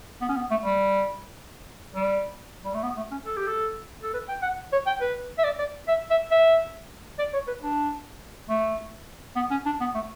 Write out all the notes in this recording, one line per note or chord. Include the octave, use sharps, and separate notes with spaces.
B3
C#4
B3
A3
G3
G3
G3
A3
B3
A3
C#4
A4
G4
A4
A4
B4
G5
F#5
C#5
G5
B4
E5
D5
D5
E5
E5
E5
D5
C#5
B4
D4
A3
B3
C#4
D4
B3
A3